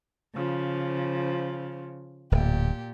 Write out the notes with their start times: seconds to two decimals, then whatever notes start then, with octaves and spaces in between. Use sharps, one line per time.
0.35 C#3 F3
2.32 D1 A#2 G4